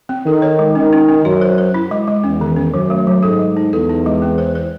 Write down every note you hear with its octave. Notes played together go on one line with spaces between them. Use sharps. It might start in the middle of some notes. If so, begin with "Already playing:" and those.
C4
D#3 A4
C#5
G#3
D#3 C#4
C#4
C#4
F#2 F#4
C5
C5
E4
G#3
G#3
E2 C#4
D#3
C#4
F#2 F#3
A3
F#3
G#2 A4
G#3
D#4
E2 A4
D#4
G#3
C4
C5
C5